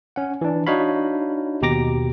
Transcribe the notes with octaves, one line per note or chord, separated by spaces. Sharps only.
C#4 F#5
E3 D4
D4 D#4 F#4 C#5 F5 B5
D#2 B2 G4 A#5 D6 A#6